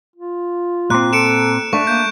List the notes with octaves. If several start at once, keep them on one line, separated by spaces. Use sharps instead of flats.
F4
A#2 C4 F#6
A4 C#7 D7 E7
A3 D4 C#6
A#3 G6